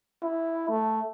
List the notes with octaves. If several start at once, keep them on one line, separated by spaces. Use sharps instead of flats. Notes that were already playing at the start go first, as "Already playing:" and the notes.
E4
A3